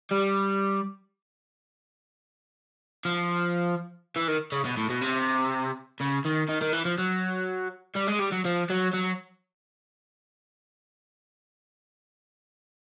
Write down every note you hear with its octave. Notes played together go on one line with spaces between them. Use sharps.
G3
F3
E3
D#3
C#3
B2
A2
B2
C3
C#3
D#3
D#3
D#3
E3
F3
F#3
G3
G#3
G3
F#3
F3
F#3
F#3